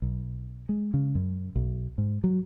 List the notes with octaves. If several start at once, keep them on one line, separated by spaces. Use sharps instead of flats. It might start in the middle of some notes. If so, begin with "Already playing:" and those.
B1
G#3
C#3
F#2
B1
G#2
F#3